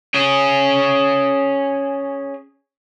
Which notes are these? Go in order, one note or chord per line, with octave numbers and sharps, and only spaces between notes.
C#4 G#4